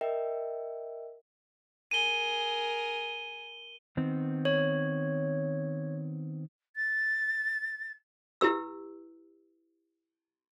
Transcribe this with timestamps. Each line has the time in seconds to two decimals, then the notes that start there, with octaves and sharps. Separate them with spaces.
0.01 A#4 D#5 E5 G5
1.91 G#4 A#4 D#7 G7
3.97 D#3 B3 C4
4.45 C#5
6.76 A6
8.41 E4 G4 B4 E6